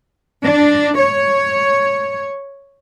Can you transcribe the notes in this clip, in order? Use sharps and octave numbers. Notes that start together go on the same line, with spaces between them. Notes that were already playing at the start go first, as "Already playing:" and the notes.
D4
C#5